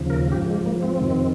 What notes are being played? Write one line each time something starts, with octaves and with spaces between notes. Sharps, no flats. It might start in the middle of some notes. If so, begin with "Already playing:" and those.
Already playing: D#2 C#3 F3
A#4
G#2 F3 G4
G#3
A#3
C4
F2 C3 D#3